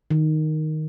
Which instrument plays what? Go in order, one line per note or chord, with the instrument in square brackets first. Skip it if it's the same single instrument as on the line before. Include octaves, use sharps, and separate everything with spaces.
[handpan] D#3